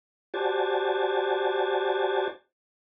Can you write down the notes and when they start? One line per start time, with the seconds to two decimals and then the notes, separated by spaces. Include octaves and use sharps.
0.34 F#4 G4 C5 D5 G#5 A5